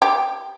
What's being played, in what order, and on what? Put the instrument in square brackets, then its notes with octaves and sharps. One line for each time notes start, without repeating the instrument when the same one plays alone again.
[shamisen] G4